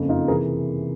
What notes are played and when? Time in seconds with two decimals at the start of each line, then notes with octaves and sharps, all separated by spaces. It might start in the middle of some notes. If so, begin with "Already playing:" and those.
Already playing: F#1 F2 C#3
0.09 D#4 F4
0.28 C3 E3 G#4 A#4